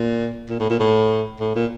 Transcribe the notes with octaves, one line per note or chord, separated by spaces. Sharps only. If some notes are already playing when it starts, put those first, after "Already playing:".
Already playing: A#2
A#2
A2
A#2
A2
A2
A#2